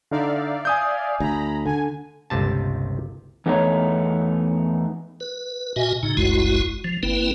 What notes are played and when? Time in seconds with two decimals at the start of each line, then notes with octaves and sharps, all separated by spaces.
0.11 D3 D#4 D5 E5 F5
0.65 G#5 D#6 G6
1.20 D2 A#5 B5
1.66 D3 G#5
2.30 G1 C#2 C3 A5
3.46 E2 A3 B3 D#4 C#5
5.20 B4
5.76 A#2 F#4 D#5 E5 G#5
6.03 A2 C#3 D#4
6.17 F#1 C2 F#2 G#3 E4 F#4
6.84 F3
7.03 G1 A#3 C4 E4 B4